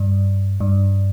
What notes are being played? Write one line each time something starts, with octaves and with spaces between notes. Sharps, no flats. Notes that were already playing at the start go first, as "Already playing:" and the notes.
Already playing: G2
G2